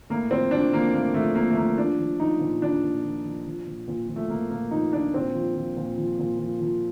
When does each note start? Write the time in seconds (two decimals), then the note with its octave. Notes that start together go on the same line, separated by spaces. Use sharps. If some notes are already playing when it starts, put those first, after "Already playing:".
0.10 A2 A#3
0.31 F3 C4
0.51 F3 D4
0.73 F3 A#3
0.94 A2 A#3
1.14 F3 A3
1.35 F3 A#3
1.50 A3
1.56 F3 A#3
1.78 F3 D4
1.99 F3
2.20 F3 D#4
2.40 A#2
2.62 F3 D4
2.83 A#2
3.03 F3
3.24 F3
3.46 F3
3.67 A#2
3.88 A#2
4.08 F3
4.16 A3
4.30 A#2 A#3
4.50 A#2 A#3
4.71 F3 D#4
4.92 F3 D4
5.14 A#2 C4
5.34 F3
5.56 F3
5.77 A#2
5.98 F3
6.19 A#2
6.39 F3
6.60 F3